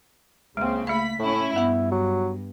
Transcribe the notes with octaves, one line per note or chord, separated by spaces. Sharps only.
C#2 C#3 G#3 A#3 C4
A3 F5 B5 B6
A2 C#4 E4
G2 B3 E4 B5
F#3